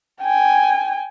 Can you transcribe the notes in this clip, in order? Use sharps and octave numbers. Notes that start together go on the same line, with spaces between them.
G5 G#5